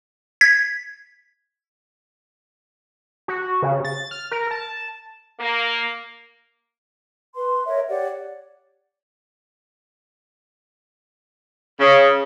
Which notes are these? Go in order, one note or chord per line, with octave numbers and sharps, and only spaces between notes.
G#6 B6
F#4
C#3
A6
F6
A#4
A5
A#3
B4 C6
A#4 C#5 D#5 E5
G4 C#5 D5 F#5
C#3